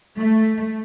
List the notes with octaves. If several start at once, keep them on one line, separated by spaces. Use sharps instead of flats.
A3